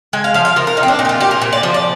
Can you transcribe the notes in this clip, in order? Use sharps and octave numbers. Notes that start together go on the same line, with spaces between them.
G#3 G#5
F5
F3 F5
F5
F3 A#4
A#4
A#2 D#4
C4
D4
A#2 D#4
G4
F4
A#2 G4
A#4
A#2 C5
D5
F3 C5
D5